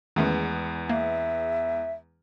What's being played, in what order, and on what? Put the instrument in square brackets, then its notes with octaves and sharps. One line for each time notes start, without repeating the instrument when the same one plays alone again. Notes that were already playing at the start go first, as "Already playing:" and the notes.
[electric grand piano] E2 G#3 B3 [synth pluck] D#3 A3 C#4
[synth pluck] A#3 [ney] E5